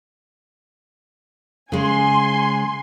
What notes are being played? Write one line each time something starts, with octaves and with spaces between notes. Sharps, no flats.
C#3 G#3 G#5 C6